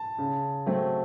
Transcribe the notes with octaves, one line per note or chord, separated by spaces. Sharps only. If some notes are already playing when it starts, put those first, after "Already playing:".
Already playing: A5
C#3
F#3 A3 C4